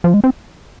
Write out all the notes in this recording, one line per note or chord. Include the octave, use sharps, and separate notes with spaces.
F3
G#3
C4